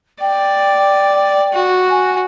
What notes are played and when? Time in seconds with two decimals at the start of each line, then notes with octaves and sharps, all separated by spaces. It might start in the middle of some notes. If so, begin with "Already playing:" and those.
0.21 D5 G5
1.53 F#4
1.90 G#5